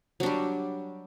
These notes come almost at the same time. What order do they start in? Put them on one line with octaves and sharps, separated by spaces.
F#3 D4 G3